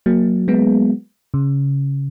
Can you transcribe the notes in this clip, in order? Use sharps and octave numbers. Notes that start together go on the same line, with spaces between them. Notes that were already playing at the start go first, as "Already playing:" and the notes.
F#3 A#3
G#3 B3
C#3